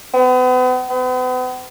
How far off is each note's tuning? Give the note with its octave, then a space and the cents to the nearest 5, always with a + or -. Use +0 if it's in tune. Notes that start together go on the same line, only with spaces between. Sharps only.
B3 +40
B3 +40